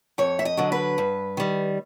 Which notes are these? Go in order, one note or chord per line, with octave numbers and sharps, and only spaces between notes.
F2 C#5
E5
D#5
D3 F#3
B4
G2
D#3 G3